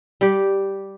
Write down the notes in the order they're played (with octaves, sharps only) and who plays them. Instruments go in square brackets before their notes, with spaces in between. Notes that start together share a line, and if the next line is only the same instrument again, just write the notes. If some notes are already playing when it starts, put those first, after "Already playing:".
[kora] G3 G4